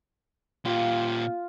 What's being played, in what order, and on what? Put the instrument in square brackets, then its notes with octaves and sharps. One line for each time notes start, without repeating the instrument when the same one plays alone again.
[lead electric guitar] A#2 G4 [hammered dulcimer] F4